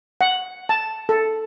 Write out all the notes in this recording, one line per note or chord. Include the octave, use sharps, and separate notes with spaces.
F#5
A5
A4